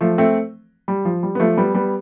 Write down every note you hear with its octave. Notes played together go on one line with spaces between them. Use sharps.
F3 A3
A3 C4
G3
F3
G3
B3
F3 A3
G3 B3
G3 B3